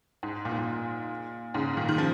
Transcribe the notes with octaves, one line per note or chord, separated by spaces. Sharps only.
G#2
A#2
G#2
A#2
G#2 C#3
A#2 D#3
D#3
C#3 F3